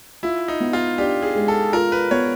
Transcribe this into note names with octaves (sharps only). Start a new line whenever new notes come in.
E4 F4
D#4
B3
F4
D4 G4
G#4
G#3
A4
F4 A#4
B4
B3 C#5